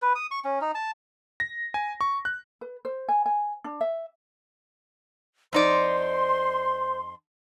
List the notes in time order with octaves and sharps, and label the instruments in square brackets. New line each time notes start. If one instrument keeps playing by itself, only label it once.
[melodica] B4
D#6
C#6
C#4
D#4
A5
[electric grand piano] A#6
G#5
C#6
F#6
[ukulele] B4
C5
G#5
G#5
D4
E5
[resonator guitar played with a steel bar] F2 D#4 D5 [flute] C5 [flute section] C6